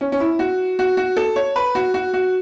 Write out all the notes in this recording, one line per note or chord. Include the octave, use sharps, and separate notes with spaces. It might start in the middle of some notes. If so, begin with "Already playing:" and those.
C#4
C#4
E4
F#4
F#4
F#4
A4
C#5
B4
F#4
F#4
F#4